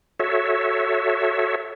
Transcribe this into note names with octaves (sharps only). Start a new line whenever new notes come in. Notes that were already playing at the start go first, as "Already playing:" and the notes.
F#4 A4 C#5 E5